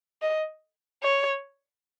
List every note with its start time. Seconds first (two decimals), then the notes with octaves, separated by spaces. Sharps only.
0.22 D#5
1.02 C#5